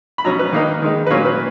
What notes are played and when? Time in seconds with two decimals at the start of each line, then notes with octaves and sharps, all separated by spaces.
0.18 B5
0.24 B2 F#3 C#4 A#5
0.39 B4
0.53 D#3 A#3 D#4
0.82 D#3 G#3 D#4
1.06 B4
1.10 A#2 F#3 A#3 C#4 C#5
1.25 B4